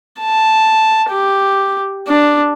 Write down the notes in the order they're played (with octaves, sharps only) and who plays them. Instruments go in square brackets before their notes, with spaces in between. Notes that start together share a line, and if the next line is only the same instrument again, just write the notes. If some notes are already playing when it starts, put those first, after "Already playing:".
[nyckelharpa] A5
G4
D4